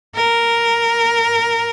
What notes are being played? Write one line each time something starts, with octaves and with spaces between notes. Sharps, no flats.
A#4